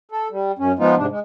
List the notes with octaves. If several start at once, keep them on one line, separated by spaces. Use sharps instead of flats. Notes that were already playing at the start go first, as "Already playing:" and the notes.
A4
G3
F#2 C#4
F3 G#3 B3 D#4 F4
G#2 C3 D4
G#3